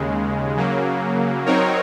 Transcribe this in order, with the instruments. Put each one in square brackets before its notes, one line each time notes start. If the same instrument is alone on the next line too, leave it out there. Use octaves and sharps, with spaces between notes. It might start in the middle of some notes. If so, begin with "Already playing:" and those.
Already playing: [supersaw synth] D#2 C#3 G#3
C#3 F#3 A#3
F#3 C4 D#4 A#4 C#5